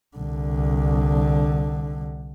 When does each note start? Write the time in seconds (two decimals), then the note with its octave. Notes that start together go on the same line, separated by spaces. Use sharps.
0.17 C2 D3